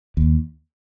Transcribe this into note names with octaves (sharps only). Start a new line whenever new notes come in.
D#2